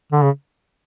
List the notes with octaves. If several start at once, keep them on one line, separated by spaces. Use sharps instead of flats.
D3
C#3